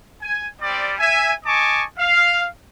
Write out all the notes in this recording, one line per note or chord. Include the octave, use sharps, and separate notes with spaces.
G#5
G3 C4 D5
E5 G#5
D#5 G#5 A5 C#6 D6
F5